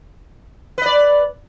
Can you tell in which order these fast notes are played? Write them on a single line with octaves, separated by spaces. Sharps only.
B4 D#5 D5